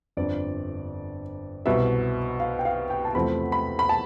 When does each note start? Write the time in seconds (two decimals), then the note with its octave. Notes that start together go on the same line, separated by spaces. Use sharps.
0.17 G1 F2 D3 D5
1.65 C2 B2 G3 E5
2.40 F5
2.59 G5
2.65 F5
2.90 G5
3.05 A5
3.14 E2 C3 F3 A3 C4 B5
3.52 B5
3.79 B5
3.89 A5